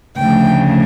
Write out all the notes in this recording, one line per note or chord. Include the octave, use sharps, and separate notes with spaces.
D2 C#3 F3 A3 G5